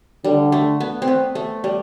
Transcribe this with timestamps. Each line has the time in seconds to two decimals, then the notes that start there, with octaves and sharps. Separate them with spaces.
0.24 D3 G3
0.52 A3
0.80 B3
1.02 C4
1.08 B3
1.35 A3
1.64 G3